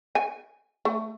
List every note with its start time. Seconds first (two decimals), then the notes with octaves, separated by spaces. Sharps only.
0.15 G#5
0.85 A3